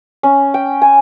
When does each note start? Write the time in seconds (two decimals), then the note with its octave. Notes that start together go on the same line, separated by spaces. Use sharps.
0.23 C#4
0.54 G5
0.82 G#5